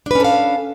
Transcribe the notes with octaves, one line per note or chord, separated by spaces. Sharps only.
C#4 D4 A4 B4 F5